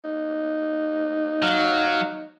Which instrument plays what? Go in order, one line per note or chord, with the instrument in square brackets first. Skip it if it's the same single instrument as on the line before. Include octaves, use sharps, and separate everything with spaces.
[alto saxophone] D#4
[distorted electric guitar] F#3 [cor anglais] F5